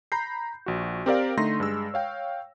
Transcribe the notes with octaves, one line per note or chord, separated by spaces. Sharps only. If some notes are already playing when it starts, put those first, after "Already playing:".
A#5 B5 G6 C7
A#1 F#4
C4 G4 A#4 D5 F5 G5
D3 A3 D#4 C6 A#6
G2 G#3 E6
C#5 F5 G5